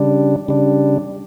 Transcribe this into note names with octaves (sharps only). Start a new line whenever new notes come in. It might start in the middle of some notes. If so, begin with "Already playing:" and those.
Already playing: C#3 G3 D4
C#3 G3 D4